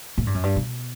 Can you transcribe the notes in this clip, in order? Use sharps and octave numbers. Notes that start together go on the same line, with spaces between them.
A2
G2
F#2
G2
B2